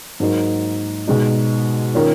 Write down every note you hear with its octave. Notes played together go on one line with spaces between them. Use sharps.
G#2 F#3 A#3 D#4
B2 G#3 D#4
D#3 A#3 C#4 F4